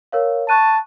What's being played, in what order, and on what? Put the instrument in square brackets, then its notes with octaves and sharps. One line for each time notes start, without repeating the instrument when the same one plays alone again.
[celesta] A#4 C#5 F5
[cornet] A5 [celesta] C#6 F#6 D#7